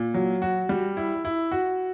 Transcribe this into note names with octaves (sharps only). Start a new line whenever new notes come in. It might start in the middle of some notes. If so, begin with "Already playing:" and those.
Already playing: A#2
F#3
F#4
G3
E4
E4
F#4